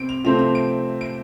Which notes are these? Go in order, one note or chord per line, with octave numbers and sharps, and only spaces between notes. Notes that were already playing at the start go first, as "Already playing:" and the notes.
Already playing: C3 C4 D7
F7
C3 F3 A3 C4 F7
F7
D7
D7